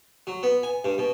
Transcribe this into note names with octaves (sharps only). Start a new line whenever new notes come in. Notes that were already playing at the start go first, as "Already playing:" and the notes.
F#3
B3
G#5
G2
B2